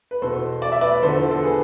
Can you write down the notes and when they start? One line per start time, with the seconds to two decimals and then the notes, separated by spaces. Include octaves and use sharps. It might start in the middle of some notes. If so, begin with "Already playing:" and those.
0.11 B4
0.22 E2 B2 A4 C5
0.62 D5
0.72 E5
0.81 B4 D5
1.02 E2 D3 F3 A4 C5
1.31 A4
1.43 G#4 B4